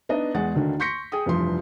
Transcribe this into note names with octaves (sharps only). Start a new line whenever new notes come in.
B3 D4 D#4 D#5
E2 G#3 G#4 F#5 A6
D2 D3 D#3 D4
C6 C#6 G6 A#6 B6 C#7
G#4 G5 D#6
F1 G2 E3 F3 C6